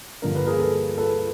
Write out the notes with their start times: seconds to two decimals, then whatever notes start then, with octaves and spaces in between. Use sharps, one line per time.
0.22 G2 D3 F3 A#3 D4 A#4
0.35 B4
0.46 G#4 A#4
0.60 A4 B4
0.98 A4 B4